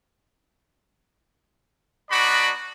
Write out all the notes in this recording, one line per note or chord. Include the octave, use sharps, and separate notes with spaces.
B3 D4 D#4 F#4 D5 B5